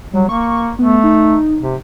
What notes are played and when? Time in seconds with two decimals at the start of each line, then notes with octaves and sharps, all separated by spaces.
0.13 F#3 G3
0.29 A#3 C#6
0.79 A3 B3
1.04 D#4
1.62 C3